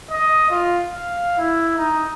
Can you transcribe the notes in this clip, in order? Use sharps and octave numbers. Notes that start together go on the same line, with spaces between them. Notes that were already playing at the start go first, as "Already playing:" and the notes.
D#5
F4
F5
E4
D#4